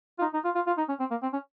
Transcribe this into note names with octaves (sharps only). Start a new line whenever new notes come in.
F4
D#4
D#4
F4
F4
F4
D#4
C#4
C4
A#3
C4
C#4